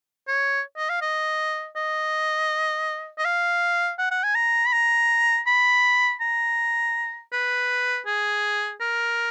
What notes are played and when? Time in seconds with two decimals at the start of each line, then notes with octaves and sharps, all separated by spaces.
0.28 C#5
0.77 D#5
0.90 F5
1.02 D#5
1.76 D#5
3.18 D#5
3.25 F5
3.99 F#5
4.11 F#5
4.24 G#5
4.35 A#5
4.66 B5
4.73 A#5
5.47 B5
6.21 A#5
7.33 B4
8.06 G#4
8.81 A#4